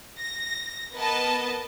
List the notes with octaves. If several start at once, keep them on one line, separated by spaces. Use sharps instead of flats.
A#6
B3 A#4 B4 D#5 A5